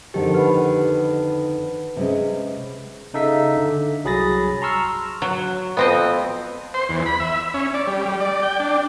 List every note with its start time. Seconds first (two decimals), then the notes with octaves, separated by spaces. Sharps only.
0.14 F2 D3 D#3 G4
0.34 B4 F#5 B5
1.96 C3 G#3 C#4
3.14 C#3 D#4 A4 E5 F5 B6
3.57 D3
4.04 C2 F#3 G#4 B5 A6 A#6
4.61 A5 A#5 C6 C#6 E6 F6
5.22 F#3
5.77 F2 B3 C4 D#5
6.74 C5
6.89 E2
7.06 B5
7.20 E5
7.54 C#4
7.74 D5
7.87 G3
8.05 G3
8.20 D5
8.43 G5
8.60 D4